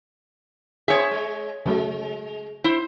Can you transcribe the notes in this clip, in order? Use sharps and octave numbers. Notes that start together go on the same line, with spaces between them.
B3 C4 G#4 C#5 E5
G#3
C#3 F#3 G#3 A3
E4 C5